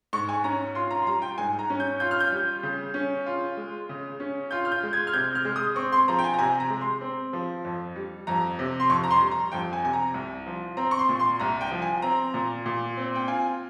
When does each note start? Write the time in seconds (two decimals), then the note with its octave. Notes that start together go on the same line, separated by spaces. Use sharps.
0.13 G#2 C#6
0.29 G#5
0.44 C#4 A#5
0.75 F4 C6
0.91 A#5
1.02 C6
1.07 G3 A#5
1.22 G5
1.38 G#2 G#5
1.59 A#5
1.70 C#4
1.80 G6
2.00 F4 G6
2.11 F6
2.20 G6
2.32 G3
2.63 C#3
2.94 C#4
3.26 F4
3.57 G#3
3.89 C#3
4.20 C#4
4.51 F4 G6
4.65 F6
4.72 G6
4.83 G#3
4.93 G#6
5.07 F6
5.13 C3 G6
5.35 F6
5.45 G#3
5.56 D#6
5.76 C4 C#6
5.92 C6
6.08 F3 A#5
6.19 G5
6.24 G#5
6.34 A#5
6.39 C3 G#5
6.60 A#5
6.70 G#3
6.81 C6
7.01 C4
7.33 F3
7.65 F2
7.96 G3
8.27 F2 A#5
8.59 C3
8.80 C6
8.90 F2 C#6
9.04 A#5
9.11 C6
9.21 G3
9.31 A#5
9.52 F2 G5
9.73 G#5
9.84 C3 G#5
9.93 A#5
10.14 C2
10.46 F3
10.77 C4 A#5
10.91 C#6
10.99 C6
11.09 A#2
11.20 C6
11.40 C2 A#5
11.61 G5
11.71 F3
11.82 G#5
12.02 C4 A#5
12.34 A#2
12.66 A#2
12.97 C4
13.15 G5
13.28 F4 G#5